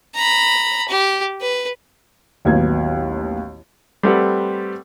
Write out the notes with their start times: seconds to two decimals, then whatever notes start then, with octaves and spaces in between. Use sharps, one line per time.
0.15 A#5 B5
0.89 G4
1.41 B4
2.45 A1 D#2 F#3 B3 G#6
4.03 G3 A3 C4 G4 B4 F#5